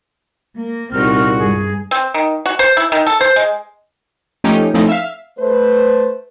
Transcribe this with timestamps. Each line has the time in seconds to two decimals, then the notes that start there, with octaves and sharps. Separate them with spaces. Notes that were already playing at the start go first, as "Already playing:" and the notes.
0.56 A#3
0.92 C2 A#2 C4 D#4 F#4 F6
1.38 G2 G#4
1.91 C4
2.14 D#3
2.46 F#4
2.59 C5
2.77 E4
2.92 D#3
3.07 A4
3.21 C5
3.36 G#3
4.44 F3 A3 C#4 D#4 G4
4.74 F3 A3 C4 C#4 D#4 E4
4.89 E5 F5
5.39 A3 B4 C5